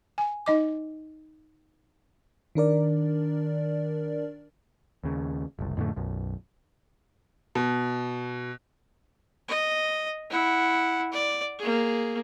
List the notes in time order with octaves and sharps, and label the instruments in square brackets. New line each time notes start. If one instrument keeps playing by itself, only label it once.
[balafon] G#5
D#4 D#5 D6
[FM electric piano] D#3 D4 A#4 D5
[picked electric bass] D#2 C#3
F#1 C2
F2 A2 D3 A3
B1 F#2
[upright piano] B2
[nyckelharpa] D#5
E4 F#5
D5
A#3 G#4